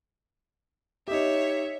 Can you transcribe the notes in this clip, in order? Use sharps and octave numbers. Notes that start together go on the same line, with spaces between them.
D#4 G4 C#5 E5